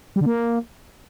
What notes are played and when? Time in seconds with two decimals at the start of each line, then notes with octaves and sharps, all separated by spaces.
0.16 G3
0.21 D3
0.26 A#3